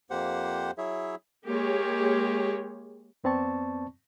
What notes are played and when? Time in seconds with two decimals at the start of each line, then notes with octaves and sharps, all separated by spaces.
0.10 F2 A#3 G4 C5 F#5
0.78 F#3 E4 G#4 C#5 E5
1.46 G#3 A#3 G4 G#4 C#5
3.24 F2 B3 C4 D5 A5 C#6